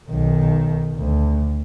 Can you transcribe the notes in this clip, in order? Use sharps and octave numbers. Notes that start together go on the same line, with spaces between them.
B1 D#3
D2